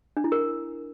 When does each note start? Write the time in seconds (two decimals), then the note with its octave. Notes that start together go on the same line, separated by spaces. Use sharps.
0.17 D4
0.24 E4
0.32 A#4